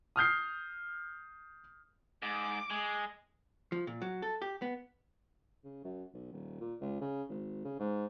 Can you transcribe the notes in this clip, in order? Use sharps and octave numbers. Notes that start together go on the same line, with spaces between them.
D#6 F6 G6 C7
G#2 D6
G#3
F3
A#2
F#3
A4
G4
B3
C#3
F#2
B1
D#1
A#2
C#2
C#3
G#1
C#3
G#2